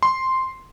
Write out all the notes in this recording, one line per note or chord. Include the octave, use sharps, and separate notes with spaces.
C6